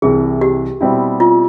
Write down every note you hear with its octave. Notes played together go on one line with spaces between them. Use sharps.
C2 C3 E3 G#4
G4
B2 G3 C4 E4
F4